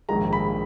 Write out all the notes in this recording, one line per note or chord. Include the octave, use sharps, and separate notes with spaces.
A#1 G#2 D#3 G#3 A#5
B5